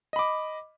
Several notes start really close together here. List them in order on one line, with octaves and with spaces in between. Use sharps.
D#5 B5 D6